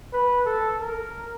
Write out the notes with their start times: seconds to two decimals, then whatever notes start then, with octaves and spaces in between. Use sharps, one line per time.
0.13 B4
0.46 A4
0.80 A#4